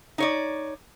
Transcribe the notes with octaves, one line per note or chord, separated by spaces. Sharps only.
D#4 C#5 D5